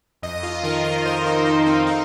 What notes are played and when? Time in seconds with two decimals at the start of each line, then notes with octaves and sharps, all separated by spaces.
0.22 F2 D#5
0.43 F4
0.63 D#3 A#4
0.85 A#4
1.05 F2 C5
1.26 D#4
1.45 D#3 D#4
1.66 C4
1.87 D#4